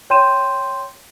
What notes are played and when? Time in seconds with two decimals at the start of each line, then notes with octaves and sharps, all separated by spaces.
0.10 C#5 G5 C6 G6 D#7 E7